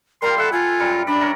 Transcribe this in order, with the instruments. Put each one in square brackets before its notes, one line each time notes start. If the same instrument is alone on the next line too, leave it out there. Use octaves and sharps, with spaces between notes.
[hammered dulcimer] G3 F4 G4 [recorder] A#4 [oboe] C6
[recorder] A4 [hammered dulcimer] E5 F#5
[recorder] F4 [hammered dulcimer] A4 F#5 [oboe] G#5
[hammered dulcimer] F#2 G3 A#4
[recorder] D4 [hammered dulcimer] D5 [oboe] B5
[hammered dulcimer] A#4 C#5 A#5